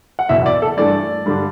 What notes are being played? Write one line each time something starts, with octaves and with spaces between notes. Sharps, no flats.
F#5
F#1 E2 B2 F#3 E5
D5
A4
G2 E3 A3 D4 D5
G2 D3 G3 D4